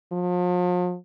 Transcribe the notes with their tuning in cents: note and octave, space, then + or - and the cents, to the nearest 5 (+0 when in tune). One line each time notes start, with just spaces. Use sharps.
F3 +40